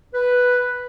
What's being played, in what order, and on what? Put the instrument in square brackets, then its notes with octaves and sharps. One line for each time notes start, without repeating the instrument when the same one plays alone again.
[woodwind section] B4